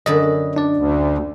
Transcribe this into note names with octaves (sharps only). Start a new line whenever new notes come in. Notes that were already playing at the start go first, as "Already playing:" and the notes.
F#2 D3 D#5 B5
D4 D5
D2